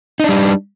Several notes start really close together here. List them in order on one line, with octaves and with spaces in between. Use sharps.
D#4 D4 G3